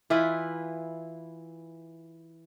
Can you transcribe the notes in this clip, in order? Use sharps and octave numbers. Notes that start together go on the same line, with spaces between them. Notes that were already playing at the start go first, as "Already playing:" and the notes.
E3 E4 F4 B4